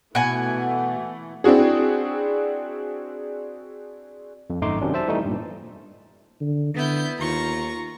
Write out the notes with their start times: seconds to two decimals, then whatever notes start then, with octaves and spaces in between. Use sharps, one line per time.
0.15 B2 E3 A3 F#5 G#5
1.44 C4 D4 E4 F#4 G#4
4.50 F2
4.61 G#1 F#2 A3 D#4 C6 D6
4.81 C3 D#3 F#3 C#4 D4
4.94 C5 E5 A5
5.07 E3 G3 A3 D#4
5.25 G2 A#2
6.41 D3
6.74 D3 B3 E4 G6
7.19 D#2 F4 A#5 C#6